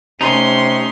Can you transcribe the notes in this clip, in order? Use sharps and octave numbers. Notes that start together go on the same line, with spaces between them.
C3 A3 C#4 D#4 C6